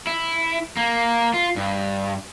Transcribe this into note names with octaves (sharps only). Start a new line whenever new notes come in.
E4
A#3
F4
G2